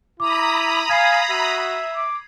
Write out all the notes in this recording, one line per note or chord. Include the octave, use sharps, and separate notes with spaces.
E4 A#5 B5 D6 D#6
F5 G#5 G#6 C7
F#4 E5
D6